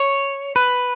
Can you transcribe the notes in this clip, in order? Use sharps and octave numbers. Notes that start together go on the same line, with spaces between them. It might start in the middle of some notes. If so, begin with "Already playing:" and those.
Already playing: C#5
B4